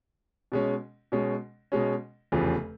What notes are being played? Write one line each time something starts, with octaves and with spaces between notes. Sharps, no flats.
B2 G#3 C#4
B2 G#3 C#4
B2 G#3 C#4
F1 E2 C#3 F3